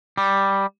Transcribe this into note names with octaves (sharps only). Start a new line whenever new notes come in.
G3